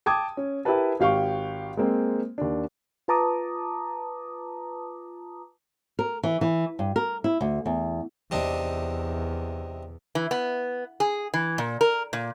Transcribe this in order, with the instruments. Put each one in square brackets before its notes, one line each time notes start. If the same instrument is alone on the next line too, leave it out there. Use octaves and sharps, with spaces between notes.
[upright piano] G5 A5 D6 D#6 G#6
C#4
E4 G4 A#4 B4 A5
G#1 G4 F5 G5 C#6
G#3 A#3 C4 C5
D#2 D4
[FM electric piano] F4 B4 A5 A#5 D6 D#6
[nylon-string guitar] A#4
E3
E3
G2
A#4
E4
D2
E2
[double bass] E2 [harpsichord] C3 D4 D#4
[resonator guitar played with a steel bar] E3
B3
G#4
E3
A#2
A#4
A#2